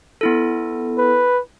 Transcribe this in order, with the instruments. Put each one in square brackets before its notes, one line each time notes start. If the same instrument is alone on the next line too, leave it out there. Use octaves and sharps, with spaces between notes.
[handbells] B3 E4 A4
[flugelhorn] B4